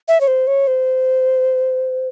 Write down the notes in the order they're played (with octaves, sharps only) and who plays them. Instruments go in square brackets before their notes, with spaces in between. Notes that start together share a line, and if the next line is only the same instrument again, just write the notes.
[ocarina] E5
C#5
C5
C#5
C5